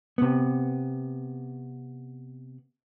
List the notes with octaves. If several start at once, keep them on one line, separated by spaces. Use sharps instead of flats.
C3 B3